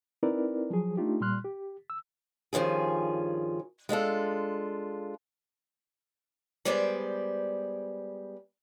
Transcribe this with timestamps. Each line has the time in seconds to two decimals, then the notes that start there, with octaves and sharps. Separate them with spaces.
0.23 C4 D#4 E4 A#4 B4 D5
0.70 F3 F#3 G#4
0.97 A3 D4 D#4 F4 G4
1.21 A#2 G3 C6 F6 F#6
1.45 G4
1.90 E6
2.53 G2 D#3 F3 C#4 G#4
3.89 G#3 D4 F4 A4
6.65 G3 G#3 B3 C5 D5